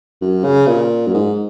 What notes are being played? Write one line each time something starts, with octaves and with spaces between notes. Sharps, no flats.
F#2
C#3
A#2
F#2
G#2